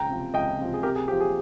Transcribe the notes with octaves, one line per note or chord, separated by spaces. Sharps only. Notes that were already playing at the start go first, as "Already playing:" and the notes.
Already playing: C#2 G5 A#5
C3 F3
C#2 D#5 G5
C3 F3
G#4
C3 G4 A#4
G#4
F3 C4 G4
G#4